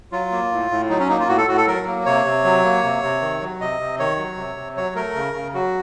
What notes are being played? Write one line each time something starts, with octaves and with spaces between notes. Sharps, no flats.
F#3 F4
A#3
A2
A2
F#3 D#4
C#4
A#3 D#4
F4
A2 F#4
A4
A2 F#4
A4
F#3 A#4
A#3
C3 C#5
C3
F#3
A#3
C3
C3
D#3
F#3
C3 D#5
C3
D#3 C#5
F#3
C3
C3
F#3 C#5
A3 A#4
C#3
C#3
F#3 F#4